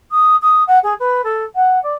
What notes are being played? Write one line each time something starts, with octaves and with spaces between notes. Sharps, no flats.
D#6
D#6
F#5
G#4
B4
A4
F#5
D5